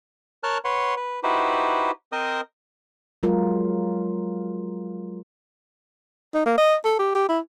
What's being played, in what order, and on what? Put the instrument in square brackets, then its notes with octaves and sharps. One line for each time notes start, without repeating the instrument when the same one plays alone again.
[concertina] A#4 C#5 A5 F6 F#6
B4 C#5 F#5 C6
B4
D#4 E4 F#4 G4 B4 C5
C4 A#4 C5 D#5 D#6
[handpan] F#3 G#3 F4 A#4
[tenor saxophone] D#4
A#3
D#5
A4
G4
G4
E4